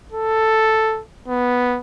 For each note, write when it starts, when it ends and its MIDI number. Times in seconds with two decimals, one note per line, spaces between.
0.12 1.01 69
1.28 1.79 59